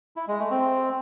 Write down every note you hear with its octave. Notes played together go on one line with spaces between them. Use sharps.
E4
G#3
A3
C4